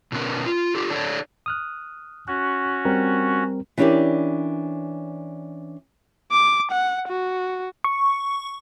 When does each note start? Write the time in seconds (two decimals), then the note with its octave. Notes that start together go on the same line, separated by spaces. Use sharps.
0.12 B2 D3 B3 C#4 A#4
0.46 F4
0.75 F4 G4 A4
0.90 D4 A4 C#5
1.46 D#6 F6 F#6
2.28 C#4 F#4 F#6
2.85 G3 C4 A#4
3.78 E3 C#4 D4 G4 A#4 D5
6.32 D6
6.71 F#5
7.09 F#4
7.84 C#6